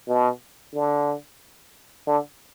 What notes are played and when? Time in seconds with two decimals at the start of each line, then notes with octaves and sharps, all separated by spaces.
0.08 B2
0.74 D3
2.07 D3